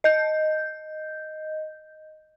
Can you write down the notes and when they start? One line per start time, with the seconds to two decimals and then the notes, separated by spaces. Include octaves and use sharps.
0.04 D#5 G6